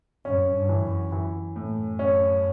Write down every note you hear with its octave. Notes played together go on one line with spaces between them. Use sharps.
F#2 C#4
G2
E3
F#2
E3
A2
F#2
C#4